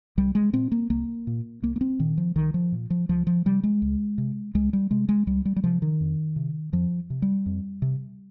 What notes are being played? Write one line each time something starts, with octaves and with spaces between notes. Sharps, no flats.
C2 G3
G#3
A#2 C4
A#3
C2 A#3
A#2
C2 A#3
A#3
C4
A#2 D#3
F3
C2 D#3
F3
A#2
F3
C#2 F3
F3
C3 G3
G#3
C#2
C3
C#2 G#3
G3
C3 G#3
G#3
C#2 G3
G3
G3
C3 F3
D#3
F2
C3
F2 F3
C3
G3
F2
C3